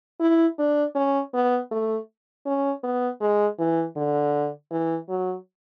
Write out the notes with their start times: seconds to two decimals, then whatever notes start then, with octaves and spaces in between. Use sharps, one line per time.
0.20 E4
0.59 D4
0.95 C#4
1.34 B3
1.71 A3
2.46 C#4
2.83 B3
3.21 G#3
3.59 E3
3.96 D3
4.71 E3
5.09 F#3